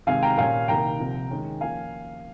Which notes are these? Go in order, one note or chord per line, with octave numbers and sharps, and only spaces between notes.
C3 D#3 G#3 F5 G#5
G5 A#5
A#2 G3 C#4 F5 G#5
C2 C3 D#3 A#3 G5 A#5
C2 C3 F3
D#2 D#3 G#3 C#4
F3 A#3 C#4 F5 G#5